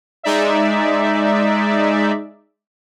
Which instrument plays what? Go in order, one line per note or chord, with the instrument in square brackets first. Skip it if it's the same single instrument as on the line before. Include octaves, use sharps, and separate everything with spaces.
[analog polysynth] G#3 D#4 D5 E5